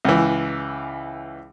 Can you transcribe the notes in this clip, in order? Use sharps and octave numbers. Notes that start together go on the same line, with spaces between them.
C#2 E3